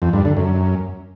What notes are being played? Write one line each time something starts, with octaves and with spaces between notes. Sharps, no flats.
F2
G2
D3
F#2